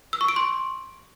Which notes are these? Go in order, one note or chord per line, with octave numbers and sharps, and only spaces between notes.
E6
C#6
D7
C6